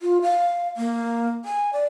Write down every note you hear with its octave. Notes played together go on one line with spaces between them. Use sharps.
F4
F5
A#3
G#5
D5